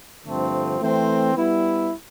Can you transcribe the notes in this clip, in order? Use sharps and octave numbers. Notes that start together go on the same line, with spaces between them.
G2 D3 F3 A3 C4
E3 A3 C4
G3 B3 E4